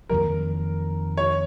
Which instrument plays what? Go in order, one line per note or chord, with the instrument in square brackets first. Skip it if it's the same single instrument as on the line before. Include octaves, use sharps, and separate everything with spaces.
[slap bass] F2 D#3 F#3 A#3 [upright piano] A#4
[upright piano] C#5